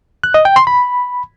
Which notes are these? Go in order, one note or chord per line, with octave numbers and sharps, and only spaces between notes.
F#6
D#5
G5
C6
B5